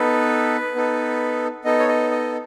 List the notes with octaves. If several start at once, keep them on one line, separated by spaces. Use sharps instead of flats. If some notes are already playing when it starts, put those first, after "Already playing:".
Already playing: B3 D#4 A4 B4
B3 D#4 A4
B3 D#4 A4 D#5
C#5
D#5
D#5